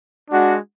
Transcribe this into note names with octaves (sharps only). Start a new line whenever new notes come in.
G#3 D4 F#4